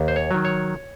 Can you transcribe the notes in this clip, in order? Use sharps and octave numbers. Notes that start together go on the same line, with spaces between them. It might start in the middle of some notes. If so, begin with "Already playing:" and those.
Already playing: D#2
C5
C#5
D#3 F#3
C#5